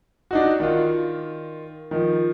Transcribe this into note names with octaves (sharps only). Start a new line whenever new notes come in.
D4 D#4 F#4
D#3 F4
D#3 F3